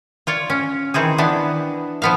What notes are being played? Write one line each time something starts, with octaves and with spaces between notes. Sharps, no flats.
F4 C#5 D5
C#4
D#3 E3 C4 G#4
E3 B3 D4
F3 B3 F5